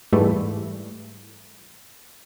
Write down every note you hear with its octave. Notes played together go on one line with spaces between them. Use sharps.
G#2 E3 G3 A3